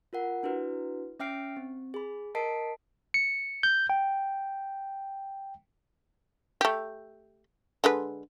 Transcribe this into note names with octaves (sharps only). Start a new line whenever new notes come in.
F4 A#4 F#5
D4 E4 F#4 B4
C#4 E5 G5 F6 C7 D7
C4
G#4 B5
A#4 D#5 A5 B6 C7 D7
C#7
G6
G5
A3 G4
D3 G#3 B4